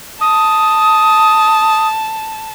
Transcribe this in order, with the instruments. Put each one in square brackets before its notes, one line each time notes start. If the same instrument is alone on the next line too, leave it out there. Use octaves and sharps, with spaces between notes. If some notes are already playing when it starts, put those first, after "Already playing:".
[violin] A5 [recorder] D#6